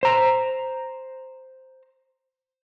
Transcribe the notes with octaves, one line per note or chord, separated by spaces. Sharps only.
C5 A#5